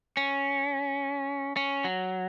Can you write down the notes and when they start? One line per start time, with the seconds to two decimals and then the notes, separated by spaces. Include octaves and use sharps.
0.17 C#4
1.57 C#4
1.84 F#3